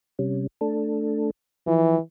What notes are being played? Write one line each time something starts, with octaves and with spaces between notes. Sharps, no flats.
C3 G3 C#4
A3 D4 A4
E3 F3